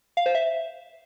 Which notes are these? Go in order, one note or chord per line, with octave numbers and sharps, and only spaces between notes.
F5
C5
E5